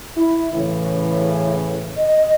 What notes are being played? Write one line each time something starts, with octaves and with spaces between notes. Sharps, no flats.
E4
A2 C#3 E3
D#5